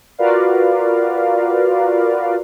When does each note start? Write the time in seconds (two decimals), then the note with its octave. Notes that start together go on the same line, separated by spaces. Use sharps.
0.18 F4 F#4 A#4 B4 D5 F5